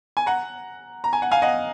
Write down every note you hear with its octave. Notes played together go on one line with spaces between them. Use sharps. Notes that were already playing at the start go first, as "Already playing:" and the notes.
G#5
F#5 A#5
A#5
G#5
F#5
F5 G#5
D#5 F#5